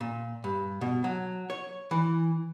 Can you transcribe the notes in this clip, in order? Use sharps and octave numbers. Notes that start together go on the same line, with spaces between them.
A#2
G2
B2
F#3
C#5
E3